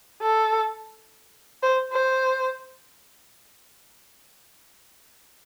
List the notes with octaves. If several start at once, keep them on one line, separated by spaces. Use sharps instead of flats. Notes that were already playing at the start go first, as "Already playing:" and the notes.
A4
C5
C5